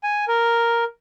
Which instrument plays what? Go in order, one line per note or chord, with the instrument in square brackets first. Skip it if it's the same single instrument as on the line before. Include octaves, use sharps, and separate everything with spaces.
[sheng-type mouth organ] G#5
A#4